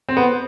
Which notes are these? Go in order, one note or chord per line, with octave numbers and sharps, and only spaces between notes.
C4
B3